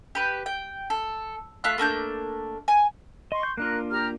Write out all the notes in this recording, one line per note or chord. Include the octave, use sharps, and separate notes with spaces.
G4 B4
G5
A4
A3 F4 B5 F#6
A3 A#3 D4 G6
G#5
D#5 C6 C#6
G6
A#3 D4 F4 A#4 F#6
G4 A#5 F6